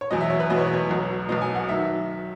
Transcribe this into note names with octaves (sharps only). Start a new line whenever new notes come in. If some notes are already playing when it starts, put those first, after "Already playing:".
C#5
E2 B2 F#3 D#5
E5
C#5
B4
E2 B2 F#3 D#5
C#5
B4
C#5
B1 B2 F#3
B1 B2 F#3 D#5
G#5
F#5
D#3 F#3 E5